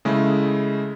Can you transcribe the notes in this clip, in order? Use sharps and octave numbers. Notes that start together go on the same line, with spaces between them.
C#3 G#3 A3 E4